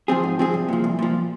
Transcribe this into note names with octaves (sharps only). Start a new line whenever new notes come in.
F3 C4 G#4
G#2
F3 C4 G#4
C2
A#2 F3
C2
A#2 F3